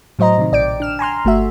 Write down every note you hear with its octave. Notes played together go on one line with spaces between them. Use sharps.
A2 F#3 C5 D#5 A#5
C3 D#3
A#1 D5 G5 D7
D4 F6 E7
G#5 A#5 C6 F6
G1 A3 F#4 E5